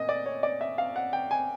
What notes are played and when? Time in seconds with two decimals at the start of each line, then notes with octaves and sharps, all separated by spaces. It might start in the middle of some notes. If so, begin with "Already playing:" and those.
Already playing: A#2 A3 D#5
0.09 D5
0.26 C#5
0.43 D5
0.61 E5
0.78 F5
0.96 F#5
1.13 G5
1.31 G#5